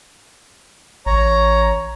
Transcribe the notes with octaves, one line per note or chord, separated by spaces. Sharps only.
A1 C#5 A#5